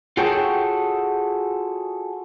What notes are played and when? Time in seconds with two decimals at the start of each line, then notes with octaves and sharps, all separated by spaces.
0.17 F4 F#4 G#4 A4 C#5 G5